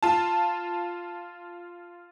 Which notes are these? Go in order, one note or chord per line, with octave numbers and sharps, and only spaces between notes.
F4 A5